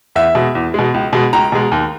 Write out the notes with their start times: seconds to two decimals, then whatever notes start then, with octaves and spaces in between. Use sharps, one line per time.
0.15 E2 E5
0.35 B2 G#3
0.55 E2
0.74 B2 G#3
0.94 C#2
1.13 B2 G#3
1.33 C#2 A#5
1.52 B2 G#3
1.72 D#2